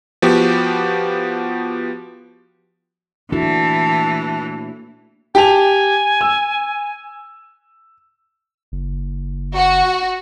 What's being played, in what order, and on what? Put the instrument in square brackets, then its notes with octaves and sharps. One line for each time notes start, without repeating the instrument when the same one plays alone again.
[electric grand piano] F3 B3 F#4 G4
[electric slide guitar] A#2 A3 A4 [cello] E3 [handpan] D4 E4 F#4 [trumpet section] A5
[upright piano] G4 A5 F7 [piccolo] G#5
[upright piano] E6
[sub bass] F#1
[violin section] F#4